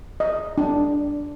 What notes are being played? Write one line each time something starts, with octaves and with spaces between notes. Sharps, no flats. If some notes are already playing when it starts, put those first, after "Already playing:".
D#5
D4